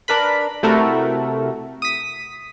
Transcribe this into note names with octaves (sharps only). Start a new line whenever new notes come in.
D4 A#4 B4 B5
C3 A3 E4 F#4 A4 A#4
D#6 B6